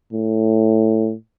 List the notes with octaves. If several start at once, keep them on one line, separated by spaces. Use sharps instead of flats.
A2